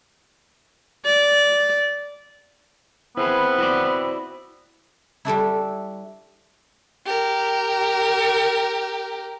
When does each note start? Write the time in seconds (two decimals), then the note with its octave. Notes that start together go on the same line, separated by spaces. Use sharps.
1.06 D5
3.17 B3 C4 E4 G#4 B4
3.58 E4 F#4 D5
5.25 G3 A3 D4 E4
7.06 G4 A#4